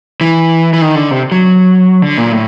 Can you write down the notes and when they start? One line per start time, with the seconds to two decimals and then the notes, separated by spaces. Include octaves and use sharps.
0.21 E3
0.73 E3
0.82 D#3
0.96 D3
1.11 C3
1.32 F#3
2.02 D3
2.18 A#2
2.32 A2